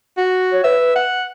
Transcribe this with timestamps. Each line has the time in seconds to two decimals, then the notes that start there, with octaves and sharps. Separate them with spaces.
0.18 F#4
0.52 C#5
0.64 B4 E5
0.96 F#5